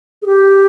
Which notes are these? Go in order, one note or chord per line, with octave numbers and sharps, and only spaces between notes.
G#4
G4